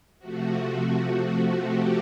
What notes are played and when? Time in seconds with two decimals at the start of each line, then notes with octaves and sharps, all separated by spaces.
0.19 C3 F3 A3 F#4
1.58 G4